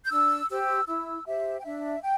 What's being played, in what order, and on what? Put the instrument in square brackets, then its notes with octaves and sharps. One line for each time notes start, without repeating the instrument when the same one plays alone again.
[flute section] G6
D4 E6
G4 C5 E6
E4 E6
G4 C5 E5
G5
D4 E5
G5